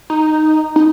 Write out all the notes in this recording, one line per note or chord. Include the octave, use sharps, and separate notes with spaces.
D#4
D#4